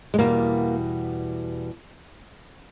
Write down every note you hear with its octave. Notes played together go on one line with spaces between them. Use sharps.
G#3
E2 B2 G3 A#3